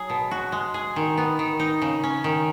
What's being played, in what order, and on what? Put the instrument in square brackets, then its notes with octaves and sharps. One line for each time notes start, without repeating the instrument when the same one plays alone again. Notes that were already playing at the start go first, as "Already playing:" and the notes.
Already playing: [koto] F#3 G#4
B2
F#4
G#3
G#4
D#3
B3
D#3
D#4
C#3
C#4
D#3